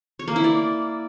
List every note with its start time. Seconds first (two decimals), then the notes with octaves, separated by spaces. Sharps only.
0.19 C#5
0.28 A#3
0.36 E4
0.44 D5